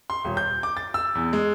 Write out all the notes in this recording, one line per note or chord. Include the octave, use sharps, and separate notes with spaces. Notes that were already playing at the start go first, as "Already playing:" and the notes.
C6
D#1
G6
D6
A6
E6
E2
G#3